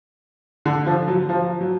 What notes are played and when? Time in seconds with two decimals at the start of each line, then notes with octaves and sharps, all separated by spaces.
0.66 D3
0.86 F3
1.08 F#3
1.29 F3
1.61 F#3